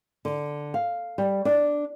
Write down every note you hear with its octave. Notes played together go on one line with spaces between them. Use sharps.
D3
F5
G3
D4